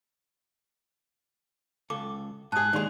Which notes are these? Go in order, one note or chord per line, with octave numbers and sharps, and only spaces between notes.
C#2 A4 D6
G#2 G#4 A5 D#6 F#6
D#2 G#3 D#4 D5 C6